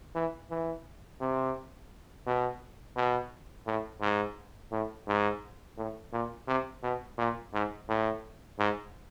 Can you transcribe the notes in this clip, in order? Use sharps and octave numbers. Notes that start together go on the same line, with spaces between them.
E3
E3
C3
B2
B2
A2
G#2
A2
G#2
A2
A#2
C3
B2
A#2
G#2
A2
G#2